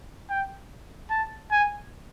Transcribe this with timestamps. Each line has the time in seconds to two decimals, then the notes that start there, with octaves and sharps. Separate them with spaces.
0.30 G5
1.10 A5
1.51 G#5